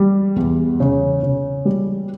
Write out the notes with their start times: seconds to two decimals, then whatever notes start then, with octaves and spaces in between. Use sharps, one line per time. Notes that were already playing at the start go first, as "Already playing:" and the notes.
Already playing: G3
0.36 E2
0.80 C#3
1.23 C#3
1.65 G3